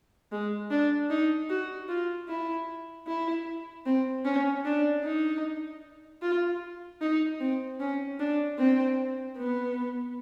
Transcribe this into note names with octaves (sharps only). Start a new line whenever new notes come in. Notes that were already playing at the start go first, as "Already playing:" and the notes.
G#3
D4
D#4
F#4
F4
E4
E4
C4
C#4
D4
D#4
F4
D#4
C4
C#4
D4
C4
B3